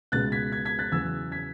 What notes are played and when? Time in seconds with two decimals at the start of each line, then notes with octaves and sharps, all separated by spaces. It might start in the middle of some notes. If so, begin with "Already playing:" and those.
0.12 C#2 B2 G#3 F#6 A6
0.32 G#6 B6
0.52 G#6 B6
0.65 G#6 B6
0.79 F#6 A6
0.92 E2 C#3 F#3 E6 G#6
1.32 G#6 B6